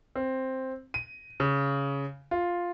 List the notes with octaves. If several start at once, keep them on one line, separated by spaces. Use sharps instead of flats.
C4
D#7
C#3
F4